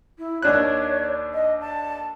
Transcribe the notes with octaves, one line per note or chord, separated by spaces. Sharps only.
E4
D#2 D4 C#5 F#6
D#5
A5